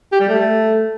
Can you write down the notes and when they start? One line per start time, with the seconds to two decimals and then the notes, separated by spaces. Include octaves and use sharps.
0.12 G4
0.20 G3
0.29 A3